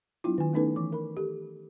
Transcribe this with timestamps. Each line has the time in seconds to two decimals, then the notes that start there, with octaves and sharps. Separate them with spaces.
0.24 F#3 B3 D4 E4 F4
0.38 D#3 G#5
0.53 A3 B3 C#4 D#4 A4 B4
0.76 E3 D6
0.92 A#4 B5
1.17 G4 A4